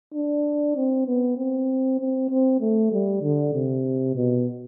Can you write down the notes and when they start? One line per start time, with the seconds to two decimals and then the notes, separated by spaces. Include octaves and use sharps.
0.14 D4
0.76 C4
1.07 B3
1.37 C4
1.99 C4
2.30 C4
2.61 A3
2.91 G3
3.22 D3
3.53 C3
4.15 B2